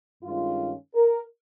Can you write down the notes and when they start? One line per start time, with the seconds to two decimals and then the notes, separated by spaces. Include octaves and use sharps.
0.23 G2 D#3 G#3 C#4 F4
0.94 A#4